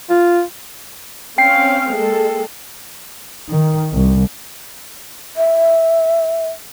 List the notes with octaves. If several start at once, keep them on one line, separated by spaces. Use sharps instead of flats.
F4
C4 C#4 F5 G5 C7
G#3 A#3 A4
D#3
C2
E5